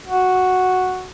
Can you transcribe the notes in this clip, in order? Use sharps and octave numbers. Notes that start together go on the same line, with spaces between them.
F#4